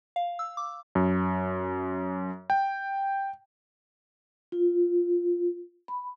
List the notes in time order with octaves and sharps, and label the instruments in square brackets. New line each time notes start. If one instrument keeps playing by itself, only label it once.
[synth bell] F5
E6
D6
[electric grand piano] F#2
G5
[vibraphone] F4
B5